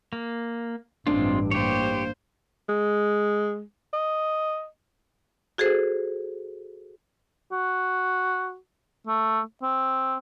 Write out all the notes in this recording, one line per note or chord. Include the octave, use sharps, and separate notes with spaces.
A#3
A1 G2 G#3 C4 D4 F4
A#3 G4 C5 C#5
G#3
D#5
F#4 G#4 A4 C5
F#4
A3
C4